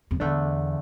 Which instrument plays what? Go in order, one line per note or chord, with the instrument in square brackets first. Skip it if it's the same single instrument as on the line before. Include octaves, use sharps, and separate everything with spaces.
[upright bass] F2
[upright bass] E2 [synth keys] D3 A3 D4